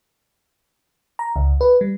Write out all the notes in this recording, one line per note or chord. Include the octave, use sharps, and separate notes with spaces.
A#5
C#2
B4
G3